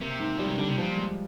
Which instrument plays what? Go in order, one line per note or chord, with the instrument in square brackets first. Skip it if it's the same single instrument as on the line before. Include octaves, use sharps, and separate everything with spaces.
[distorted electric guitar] C3 [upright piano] A#3
[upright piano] G#2
[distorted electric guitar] F3 [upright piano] G3
[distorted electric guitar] D#3
[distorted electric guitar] D3 [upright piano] G3
[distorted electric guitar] C3
[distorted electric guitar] A#2 [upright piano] F3
[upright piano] G#3